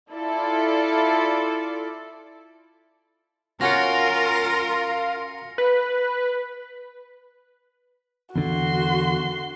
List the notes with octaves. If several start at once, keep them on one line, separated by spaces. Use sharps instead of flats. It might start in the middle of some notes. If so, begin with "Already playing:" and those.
E4 F4 A4 D5
C#4 F4 F#4 A#4 C#5 A#6 C#7
B4
E2 D3 F#4 C6